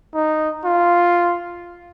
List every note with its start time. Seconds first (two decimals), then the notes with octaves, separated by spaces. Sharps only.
0.14 D#4
0.65 F4